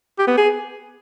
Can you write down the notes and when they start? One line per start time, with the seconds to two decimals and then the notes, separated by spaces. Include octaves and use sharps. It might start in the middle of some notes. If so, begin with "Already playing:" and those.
0.19 G4
0.27 B3
0.37 G#4